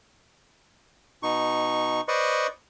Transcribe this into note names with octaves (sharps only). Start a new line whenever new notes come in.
B2 D#4 C#6
B4 C5 D5 D#5 C6 C#6